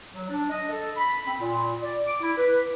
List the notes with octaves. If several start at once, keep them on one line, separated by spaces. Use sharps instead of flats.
F#3
D4
D#5
A4
B5
C4
A#2
D5
D6
E4
B4